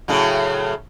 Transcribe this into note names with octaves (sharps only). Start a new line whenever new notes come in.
A2 C#3 F#3